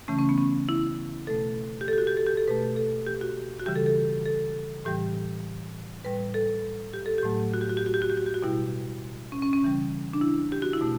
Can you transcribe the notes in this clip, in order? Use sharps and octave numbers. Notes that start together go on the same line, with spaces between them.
C#3 E3 A3 C#4
C#4
B3
C#4
E4
B2 A3 A4
G4
A4
G4
F#4
G4
A4
G4
A4
B2 A3 B4
A4
G4
F#4
F#4
C#3 E3 G3 G4
A4
A4
A4
A2 E3 G3 G4
A2 G3 B4
A4
G4
A4
G4
A2 F#3 A3
F#4
G4
F#4
G4
F#4
G4
F#4
G4
F#4
G4
F#4
B2 G3 E4
C#4
C#4
C#4
C#3 E3 G3
D4
E4
G4
F#4
E4
B2 A3